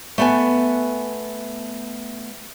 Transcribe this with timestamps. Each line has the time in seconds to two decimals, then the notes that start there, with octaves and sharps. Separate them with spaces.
0.18 A3 B3 G#5